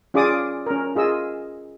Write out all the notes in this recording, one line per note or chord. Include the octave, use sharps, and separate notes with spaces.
C#4 F4 G#4 D5 D6 D#6
C#4 A#4
F4 G#4 D#5 E6